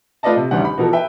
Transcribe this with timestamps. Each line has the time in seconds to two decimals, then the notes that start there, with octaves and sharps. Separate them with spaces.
0.23 A3 F4 B4 D5 D#5 A5
0.36 C3
0.51 A1 D2 D#3 G3 F#5
0.65 B5
0.78 B2 E3 F3 F#4 A4 A#4
0.93 B4 E5 G5